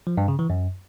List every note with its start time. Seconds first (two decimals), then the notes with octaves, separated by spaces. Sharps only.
0.07 F3
0.18 G2
0.28 C#3
0.39 E3
0.50 F#2